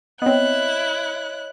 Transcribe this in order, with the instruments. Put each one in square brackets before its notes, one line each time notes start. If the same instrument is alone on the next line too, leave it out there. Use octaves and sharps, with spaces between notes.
[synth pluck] B3 C4 [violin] E4 F#6 [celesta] C#5 D#5